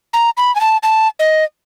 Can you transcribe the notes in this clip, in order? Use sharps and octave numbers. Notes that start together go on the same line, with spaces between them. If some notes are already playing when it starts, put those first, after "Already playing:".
A#5
B5
G#5
A5
A5
D#5